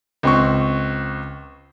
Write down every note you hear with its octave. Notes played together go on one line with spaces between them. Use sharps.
C#2 C4 C#6